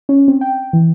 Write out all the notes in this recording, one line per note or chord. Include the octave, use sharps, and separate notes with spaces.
C#4
C4
G5
E3